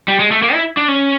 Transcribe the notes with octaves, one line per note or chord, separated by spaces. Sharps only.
G3
G#3
A3
A#3
E4
D4
C#4